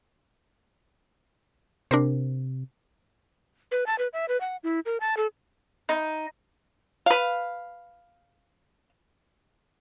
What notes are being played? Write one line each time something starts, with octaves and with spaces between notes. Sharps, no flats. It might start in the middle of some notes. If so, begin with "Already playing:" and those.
C3 D4 A#4 C5
B4
A5
B4
E5
B4
F#5
E4
A#4
A5
A4
D#4
B4 F5